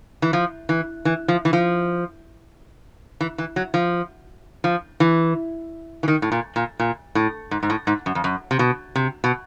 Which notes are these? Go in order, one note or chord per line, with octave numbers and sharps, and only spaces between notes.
E3
F3
E3
E3
F3
E3
F3
E3
E3
F#3
F3
F3
E3
E3
D#3
A2
A#2
A#2
A#2
A2
G#2
G#2
A2
G#2
F#2
F2
F#2
C3
B2
C3
B2